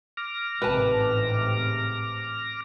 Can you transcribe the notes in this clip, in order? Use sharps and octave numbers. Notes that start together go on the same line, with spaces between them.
D6 F6 A#6
A1 G#2 C3 B4 A5